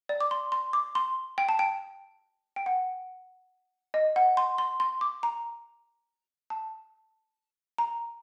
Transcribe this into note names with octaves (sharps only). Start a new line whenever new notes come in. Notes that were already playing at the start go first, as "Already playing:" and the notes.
D5
D6
C6
C6
D6
C6
G5
A5
G5
G5
F#5
D#5
F#5
C6
C6
C6
D6
A#5
A5
A#5